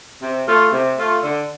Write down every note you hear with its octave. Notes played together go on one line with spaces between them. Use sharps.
C3
A3 F4
C3
A3 F4
D3